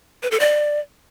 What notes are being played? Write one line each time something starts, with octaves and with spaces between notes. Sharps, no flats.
B4
A4
D5